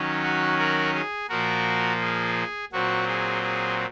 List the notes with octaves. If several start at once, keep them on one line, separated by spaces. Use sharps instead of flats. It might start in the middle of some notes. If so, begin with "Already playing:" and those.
Already playing: D#3 F#3 C#4
F#4
F#4 A#4
G#4
A#2 F3 A#3 F#4 A#4
G#4
A#2 F#3 C4 F#4
G#4
G#4